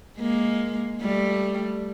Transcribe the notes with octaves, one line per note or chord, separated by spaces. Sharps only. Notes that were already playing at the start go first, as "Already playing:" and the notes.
G#3 A#3
G3 A3